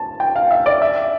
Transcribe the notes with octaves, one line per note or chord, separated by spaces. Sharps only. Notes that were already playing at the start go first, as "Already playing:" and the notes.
Already playing: A5
G5
F5
E5
D5
E5